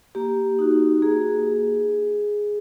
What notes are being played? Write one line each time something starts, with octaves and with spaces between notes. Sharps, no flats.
A#3 G4
D#4 F#4
A#3 G#4